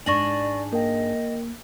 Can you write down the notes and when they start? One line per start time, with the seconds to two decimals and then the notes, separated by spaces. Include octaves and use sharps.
0.06 G#2 D4 D5 G#5 C#6 A#6 F#7
0.73 A#3 A#4 D#5 G5